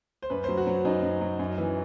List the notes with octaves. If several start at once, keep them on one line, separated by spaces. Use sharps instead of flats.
C5
F#2 B4
F#3 C5
F#4
F#3
F#2 D#4
F#2
F#3
F#2
E3